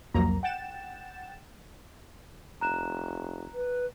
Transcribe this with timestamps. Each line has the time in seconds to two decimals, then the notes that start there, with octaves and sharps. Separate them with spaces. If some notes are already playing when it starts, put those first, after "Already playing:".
0.14 C2 F2 F#3 A#3 A#5
0.43 F#5 G5 A6 E7
2.61 F1 A#5 F#6 E7
3.54 B4